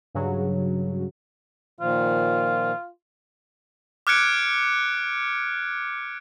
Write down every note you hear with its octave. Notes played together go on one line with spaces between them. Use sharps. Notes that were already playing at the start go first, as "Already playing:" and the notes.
G2 C#3 F#3
A#2 D#3 F3 F4
D6 F6 F#6 G#6 C#7 D7